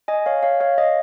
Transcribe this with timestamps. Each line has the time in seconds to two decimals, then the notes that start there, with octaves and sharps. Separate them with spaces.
0.08 D#5 G#5
0.26 C#5 F5
0.43 C#5 F5
0.60 C#5 F5
0.78 D#5